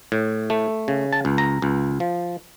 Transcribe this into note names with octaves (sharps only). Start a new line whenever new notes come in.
A2
A3
C#3
A5
C#2
A#5
C#2
F3